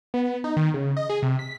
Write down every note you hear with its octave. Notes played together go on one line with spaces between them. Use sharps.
B3
D#4
D#3
C#3
D#5
G#4
C3
B6